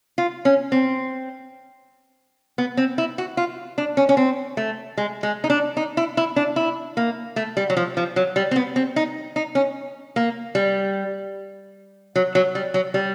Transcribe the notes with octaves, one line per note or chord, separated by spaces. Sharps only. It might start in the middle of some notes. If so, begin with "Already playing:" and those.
F4
C#4
C4
B3
C4
E4
F#4
F4
D4
C#4
C#4
C4
A3
G#3
G#3
D#4
D4
D#4
E4
E4
D4
E4
A#3
A3
G3
F#3
F3
F3
F#3
G3
C4
B3
C4
D#4
D#4
C#4
A#3
G3
F#3
F#3
G3
F#3
G3